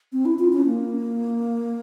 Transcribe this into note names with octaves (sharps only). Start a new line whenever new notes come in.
C4
E4
F4
C#4
A#3